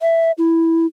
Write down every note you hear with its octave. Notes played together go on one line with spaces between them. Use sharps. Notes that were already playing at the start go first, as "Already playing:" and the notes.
E5
E4